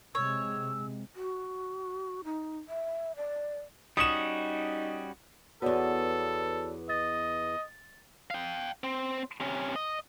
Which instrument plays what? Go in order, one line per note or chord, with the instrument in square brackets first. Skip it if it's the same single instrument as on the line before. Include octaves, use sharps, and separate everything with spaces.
[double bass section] C3 G#3 [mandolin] C#5 [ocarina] E6
[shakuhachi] F#4
D#4
E5
D5
[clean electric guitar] G3 C#4 F#4 [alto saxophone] D#4 [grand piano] D#6 E7
[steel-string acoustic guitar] E2 B3 [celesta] F#4 C#5 D5 [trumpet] A4
[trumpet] D#5 [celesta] A6
[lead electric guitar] F5 G5
C4
C3 C#4
D#5